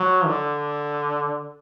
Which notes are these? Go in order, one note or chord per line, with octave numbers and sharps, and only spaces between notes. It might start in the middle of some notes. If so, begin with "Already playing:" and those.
Already playing: F#3
D3